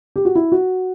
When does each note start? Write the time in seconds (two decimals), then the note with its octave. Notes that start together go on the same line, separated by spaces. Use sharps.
0.16 G4
0.25 F#4
0.35 E4
0.52 F#4